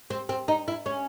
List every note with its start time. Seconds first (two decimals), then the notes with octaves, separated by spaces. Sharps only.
0.10 C4
0.29 C4
0.48 D#4
0.68 E4
0.86 C#4